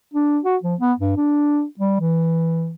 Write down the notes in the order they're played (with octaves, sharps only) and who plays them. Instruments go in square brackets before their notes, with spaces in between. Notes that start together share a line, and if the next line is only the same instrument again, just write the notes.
[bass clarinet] D4
F#4
F3
B3
G2
D4
G3
E3